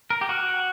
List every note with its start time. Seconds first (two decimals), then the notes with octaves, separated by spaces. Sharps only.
0.10 A#4
0.21 G4
0.29 F#4